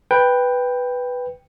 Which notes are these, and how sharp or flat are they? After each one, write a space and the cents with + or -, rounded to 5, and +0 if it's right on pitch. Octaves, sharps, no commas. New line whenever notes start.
B4 +0 G5 +10